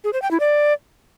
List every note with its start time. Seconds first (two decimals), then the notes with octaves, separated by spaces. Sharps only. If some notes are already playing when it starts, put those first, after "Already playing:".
0.04 G#4
0.13 C5
0.22 G5
0.31 E4
0.40 D5